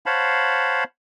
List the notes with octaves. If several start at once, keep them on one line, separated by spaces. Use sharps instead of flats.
C5 C#5 F5 F#5 A5 B5